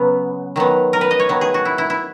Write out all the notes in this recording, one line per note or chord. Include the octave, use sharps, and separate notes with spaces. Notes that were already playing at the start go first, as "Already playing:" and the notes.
Already playing: C#3 F#3 B3
D#3 F#3 B3
A#4
B4
D#5
C#5
D#3 F#3 B3
G#4
F#4
E4
E4
E4